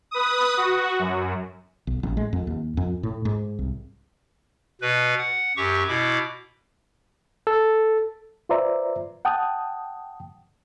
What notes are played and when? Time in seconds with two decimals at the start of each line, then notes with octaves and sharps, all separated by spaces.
0.11 B4 D#6
0.57 F#4
0.99 F#2
1.87 B1
2.03 A1
2.17 G#3
2.33 F2
2.47 D#2
2.77 F2
3.03 A2
3.25 G#2
3.59 C2
4.81 B2 B4
5.18 F#5
5.57 F#2 G4 C#6
5.88 B2 E4 D6
7.47 A4
8.49 F4 B4 C5 D5 E5 A#5
9.25 F#5 G5 A5 D#6